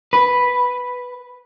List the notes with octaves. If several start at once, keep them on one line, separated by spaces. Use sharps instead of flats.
B4